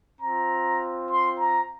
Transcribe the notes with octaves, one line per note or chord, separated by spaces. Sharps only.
C4 F4 A#5
C6
A#5